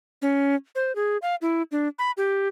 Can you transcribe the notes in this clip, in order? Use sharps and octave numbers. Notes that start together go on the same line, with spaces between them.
C#4
C5
G#4
F5
E4
D4
B5
G4